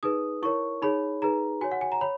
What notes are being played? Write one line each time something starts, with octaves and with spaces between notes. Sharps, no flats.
D#4 G#4 B4 D#6
E4 A#4 C#5 C#6
D#4 G#4 C#5 B5
D#4 G#4 B4 A#5
F#4 C#5 G#5
F#5
G#5
A#5
C#5 B5